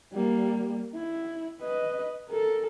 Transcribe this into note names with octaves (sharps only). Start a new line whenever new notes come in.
G3 A#3
E4
B4 D#5
A4 A#4